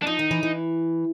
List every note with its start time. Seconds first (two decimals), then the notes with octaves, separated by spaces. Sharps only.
0.02 D4
0.06 F3 D#4
0.19 D#3
0.31 E3
0.43 E3